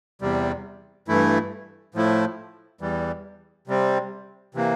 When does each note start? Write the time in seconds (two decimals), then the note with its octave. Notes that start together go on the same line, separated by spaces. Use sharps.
0.21 E2 C3 G3
1.08 G2 E3 A3 E4
1.95 A2 F3 A3 E4
2.81 E2 E3 G3
3.68 C3 G3 C4
4.55 C3 E3 A#3